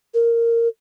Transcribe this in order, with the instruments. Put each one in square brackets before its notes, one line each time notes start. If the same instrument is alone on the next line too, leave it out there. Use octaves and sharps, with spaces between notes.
[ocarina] A#4